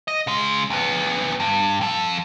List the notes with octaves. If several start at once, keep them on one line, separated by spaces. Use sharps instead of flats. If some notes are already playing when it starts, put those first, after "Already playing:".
D#5
C#3 G#3
D2 B3
G2
F2 A4